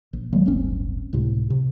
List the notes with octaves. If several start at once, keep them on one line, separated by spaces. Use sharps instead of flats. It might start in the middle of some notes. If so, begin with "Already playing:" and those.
A#1
D#3 F#3 G#3 A#3
D1 G1 C4 C#4
C#2 A2 C3
C3